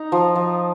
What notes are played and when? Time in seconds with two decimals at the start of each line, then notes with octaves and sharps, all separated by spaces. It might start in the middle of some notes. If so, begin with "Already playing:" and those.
Already playing: D#4 A#5
0.12 F3
0.35 F3